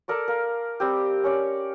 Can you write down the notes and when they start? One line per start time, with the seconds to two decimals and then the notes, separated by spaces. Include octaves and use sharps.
0.08 A4 A#4 D5 C#6
0.28 A#4 F5
0.80 G3 C4 G4
1.24 C#4 C#5 D5